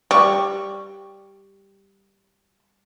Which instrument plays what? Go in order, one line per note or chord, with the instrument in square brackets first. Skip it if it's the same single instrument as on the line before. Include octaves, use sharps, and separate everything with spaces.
[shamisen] G3 [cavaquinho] C#6